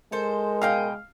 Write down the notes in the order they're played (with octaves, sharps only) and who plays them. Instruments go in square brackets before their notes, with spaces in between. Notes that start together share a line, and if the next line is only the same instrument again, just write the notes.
[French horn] G#3 [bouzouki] A4 C5 [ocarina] A#4
[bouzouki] B2 D#5 G5 [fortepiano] F5